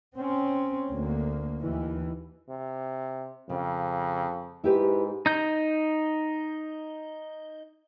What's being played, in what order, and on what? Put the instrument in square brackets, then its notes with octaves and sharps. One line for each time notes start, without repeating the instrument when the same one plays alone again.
[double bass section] C4 C#4
D2 A#3
D#2 E3
[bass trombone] C3
[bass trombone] F2 [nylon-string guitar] C#3
[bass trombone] G#2 [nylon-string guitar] E4 G4 B4
[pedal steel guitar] D#4 G6